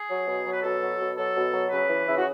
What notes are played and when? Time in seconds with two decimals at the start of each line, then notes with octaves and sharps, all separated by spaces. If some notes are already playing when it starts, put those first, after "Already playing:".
Already playing: G#4
0.09 F#3
0.27 B2
0.45 F#3
0.52 B4
0.63 B2 A4
0.81 F#3
0.99 B2
1.16 F#3 A4
1.35 B2
1.53 F#3
1.70 C#3 B4
1.88 E3
2.06 C#3 E4
2.16 F#4